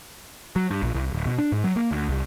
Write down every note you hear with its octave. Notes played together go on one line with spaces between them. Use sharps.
F#3
G2
A#1
C2
D1
B2
D4
G#2
F#3
A#3
D2
C2